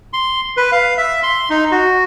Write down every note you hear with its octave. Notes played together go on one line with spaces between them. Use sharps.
C6
B4
F5
E5
C6
D#4
F#4